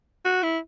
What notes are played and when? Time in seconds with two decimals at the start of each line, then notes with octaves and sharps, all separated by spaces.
0.25 F#4
0.43 E4